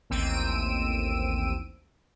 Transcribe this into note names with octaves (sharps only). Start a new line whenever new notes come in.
A1 D#2 C4 E6 D7 D#7